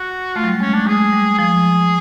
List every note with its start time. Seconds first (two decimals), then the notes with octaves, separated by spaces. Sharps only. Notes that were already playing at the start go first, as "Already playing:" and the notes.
Already playing: F#4
0.36 A3 F4
0.44 F#3
0.48 G3
0.60 G#3 C#4
0.73 A3 D4
0.87 G#3 G#4
1.13 G3
1.38 F3 G#4